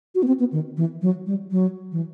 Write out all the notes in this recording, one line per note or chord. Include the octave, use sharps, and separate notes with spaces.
F#4
B3
C4
B3
D#3
E3
F#3
G3
F#3
E3